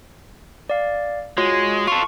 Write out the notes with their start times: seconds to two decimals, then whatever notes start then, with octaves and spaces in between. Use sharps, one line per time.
0.70 D5 F5
1.37 G#3 F4 F#4 C#5
1.87 F4 A4 C#6